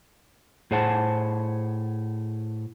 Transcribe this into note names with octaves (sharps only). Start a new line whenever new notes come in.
A2 G#4 C5 F#5 A5